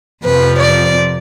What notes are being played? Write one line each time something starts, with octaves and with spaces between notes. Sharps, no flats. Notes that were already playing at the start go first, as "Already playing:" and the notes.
F2 C3 F3 B4
D5